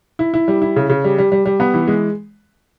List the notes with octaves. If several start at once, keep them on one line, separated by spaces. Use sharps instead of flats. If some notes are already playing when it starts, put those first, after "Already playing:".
E4
E4
G3
E4
C#3
C#3
G3
G3
G3
G3
B3
E3
G#3